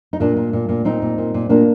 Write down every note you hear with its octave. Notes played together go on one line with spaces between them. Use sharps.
D#4
A#2 A#3 D4
A#2
A#2
A#2
A#2 C4 D#4
A#2
A#2
A#2
A#2 A#3 D4